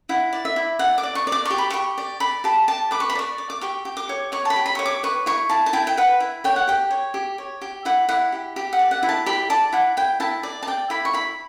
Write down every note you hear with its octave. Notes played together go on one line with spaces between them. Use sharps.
E4 F#5
D5
E5
E4
D5 F#5
D6
D5
C#6
D5
D6
G4 C#6
B5
G4 C#6
D5
D5 B5
G4 A5
G4 A5
B4 D6
C#6
B5
D5 C#6
D5
D6
G4 C#6
G4
D6
C#5
C#5 C#6
A5
B5
G4
B5
C#5 C#6
D6
B4 C#6
E4 C#6
E4 A5
A5
E4 G5
G5
B4 F#5
E4
C#5 G5
F#5
G4 G5
C#5
G4
C#5
G4
E4 F#5
E4 F#5
G4
G4
F#5
D5
F#5
E4
A5
G4 B5
D5 A5
E4 F#5
E4 G5
E4 A5
D5
A5
D5 G5
E4 B5
C#6
E4 B5